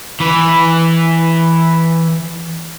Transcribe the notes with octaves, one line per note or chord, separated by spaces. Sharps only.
E3 B4